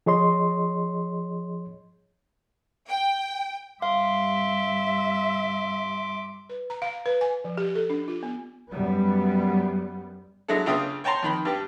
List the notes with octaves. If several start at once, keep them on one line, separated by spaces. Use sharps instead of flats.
F3 G#4 C#5 D#5 C6
G5
G2 E5 F5 C6 D6
B4
A#5
F5
B4
G#5
F3
G4
A4
D4
F4
B3
F#2 G3 B3
F#3 G#3 D4 E4 A4
C#3 D4 F4 E5 G5 D#6
C#5 G5 A5 A#5 C6
F2 D#3 B5
G2 G4